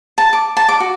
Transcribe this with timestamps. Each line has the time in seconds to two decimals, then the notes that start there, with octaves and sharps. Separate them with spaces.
0.18 A5
0.33 D6
0.57 A5
0.69 D6
0.80 F#4